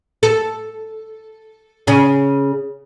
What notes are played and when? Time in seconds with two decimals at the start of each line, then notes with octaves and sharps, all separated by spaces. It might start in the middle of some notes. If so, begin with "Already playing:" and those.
0.23 A4
1.87 C#3 C#4 G#4